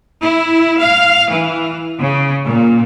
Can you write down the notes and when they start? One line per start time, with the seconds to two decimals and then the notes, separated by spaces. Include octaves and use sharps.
0.22 E4
0.80 F5
1.31 E3
2.01 C#3
2.48 A#2